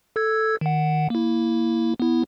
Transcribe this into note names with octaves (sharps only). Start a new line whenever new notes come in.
A4 E6 G#6
D#3 F#5
A#3 E4
B3 E4